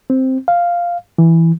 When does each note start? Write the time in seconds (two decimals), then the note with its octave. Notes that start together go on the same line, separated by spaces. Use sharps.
0.10 C4
0.48 F5
1.18 E3